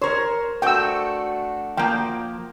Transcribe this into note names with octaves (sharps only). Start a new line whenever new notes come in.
A#4 C5 C#5
A3 D4 F#4 G5 E6
F3 A#3 G5